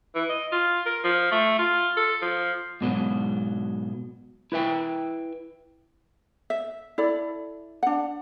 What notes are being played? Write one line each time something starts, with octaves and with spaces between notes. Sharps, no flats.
E3
D#5
F4
A#4
F3
A3
F4
A4
F3
G#2 B2 F#3
E4 B4 E5 G5
E5
E4 A4 D5
D4 F#5